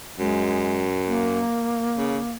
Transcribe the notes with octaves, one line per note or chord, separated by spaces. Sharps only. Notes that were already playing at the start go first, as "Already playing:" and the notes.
F#2 G#3
A#3
C#3